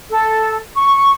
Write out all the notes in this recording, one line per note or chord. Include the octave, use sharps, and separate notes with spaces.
A4
C#6